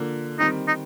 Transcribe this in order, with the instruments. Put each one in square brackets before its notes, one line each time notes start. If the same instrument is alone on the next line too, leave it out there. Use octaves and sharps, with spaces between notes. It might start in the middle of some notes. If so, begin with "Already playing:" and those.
Already playing: [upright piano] D3 F3 A#3
[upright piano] D#3 G3 C4 [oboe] D#4
[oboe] D#4